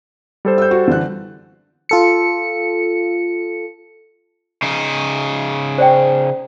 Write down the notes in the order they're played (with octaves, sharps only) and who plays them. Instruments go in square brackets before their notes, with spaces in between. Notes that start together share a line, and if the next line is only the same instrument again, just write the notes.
[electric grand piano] G3 A4 C5
[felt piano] E6 G6
F#4
D3 E3 F#6
[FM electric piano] F4 A4 C#7
[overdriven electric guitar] C#3 D#4
[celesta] C5 D5 G5